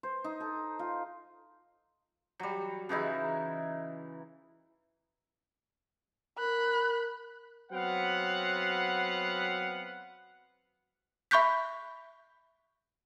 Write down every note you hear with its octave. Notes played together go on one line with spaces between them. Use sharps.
C5
D#4
A4
F4
F#3 G3
C#3 E3 D#4 E4
A#4 B5 F#6
F#3 B3 C4 B4 F5 F#5
E5 B5 C#6 F#6 G6 B6